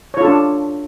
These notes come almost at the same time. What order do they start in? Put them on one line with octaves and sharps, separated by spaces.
C#5 F4 A4 D4